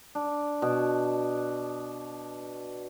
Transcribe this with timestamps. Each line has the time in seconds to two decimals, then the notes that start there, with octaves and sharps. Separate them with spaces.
0.15 D4
0.62 B2